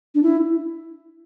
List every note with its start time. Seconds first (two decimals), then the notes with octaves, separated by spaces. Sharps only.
0.15 D4
0.23 E4